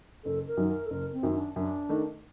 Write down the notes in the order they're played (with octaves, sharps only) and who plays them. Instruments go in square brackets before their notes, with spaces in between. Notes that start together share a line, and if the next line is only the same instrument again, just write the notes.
[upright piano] F#1 [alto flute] A4
[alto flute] A#4
[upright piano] F#2 D#3 F#3
[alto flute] A#4
A4
[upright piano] F#1 [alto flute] A#4
[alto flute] C4
[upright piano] F#2 D#3 F#3
[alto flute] D4
[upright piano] F#2 [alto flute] D4
[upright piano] D#3 A3 D#4